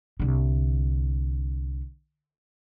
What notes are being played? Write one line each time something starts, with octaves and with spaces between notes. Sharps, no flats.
C2 D3